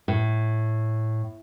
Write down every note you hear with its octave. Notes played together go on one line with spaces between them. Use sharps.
A2